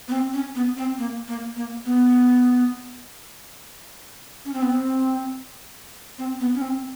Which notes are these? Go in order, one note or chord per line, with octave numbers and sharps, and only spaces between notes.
B3
C4
C#4
B3
C4
A#3
A#3
A#3
B3
C#4
C4
B3
C4
C4
B3
C#4
C4